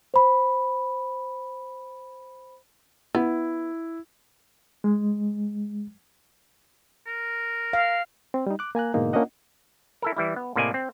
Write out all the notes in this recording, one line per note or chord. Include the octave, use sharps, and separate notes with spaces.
C5 B5
B3 E4
G#3
A#4
F5
C4
G3 D#4
D6 F#6
A#3 G#5 A#5 F#6
G#2 B2 D3 G#3 A#3 D#4
A#3 C#4 D4 F4 D#5 F#5
E4 A4 A#4
E3 G3 E4
B3
A2 C3 A#3 D5 D#5 G#5
C4